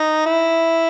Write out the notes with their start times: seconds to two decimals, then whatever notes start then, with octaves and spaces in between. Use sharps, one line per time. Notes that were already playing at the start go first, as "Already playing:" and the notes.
Already playing: D#4
0.26 E4